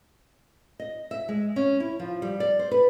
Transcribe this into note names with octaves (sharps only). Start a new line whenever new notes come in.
D#5
E5
G#3
C#4
E4
F3
G3
D5
C5
B4